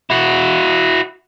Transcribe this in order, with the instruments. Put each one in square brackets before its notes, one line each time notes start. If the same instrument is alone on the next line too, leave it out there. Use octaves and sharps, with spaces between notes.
[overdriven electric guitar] E4 F#4